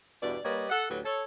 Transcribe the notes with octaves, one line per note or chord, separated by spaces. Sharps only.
E2 G2 B2 E4 D5
G3 A#3 G4 B4 C#5 D#5
A4 F#5
D2 A2 F#3 G4 B4
A4 C#5